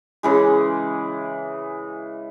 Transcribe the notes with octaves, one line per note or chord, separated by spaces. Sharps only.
C#3 E3 G#3